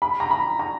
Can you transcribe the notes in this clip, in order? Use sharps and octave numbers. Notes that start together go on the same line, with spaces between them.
B5
A#5
B5
A#5